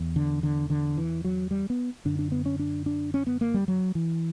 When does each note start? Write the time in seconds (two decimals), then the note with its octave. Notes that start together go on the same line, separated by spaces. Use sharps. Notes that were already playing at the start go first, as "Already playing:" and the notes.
Already playing: E2
0.16 D3
0.43 D3
0.70 D3
0.97 E3
1.25 F#3
1.51 G3
1.70 B3
2.05 F#2 D3 D4
2.19 D4
2.32 B3
2.46 C#4
2.59 D4
2.86 D4
3.14 C#4
3.27 B3
3.41 A#3
3.54 G3
3.68 F#3
3.95 E3